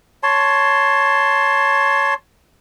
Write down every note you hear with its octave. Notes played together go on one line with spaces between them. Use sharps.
C#5 A5 C6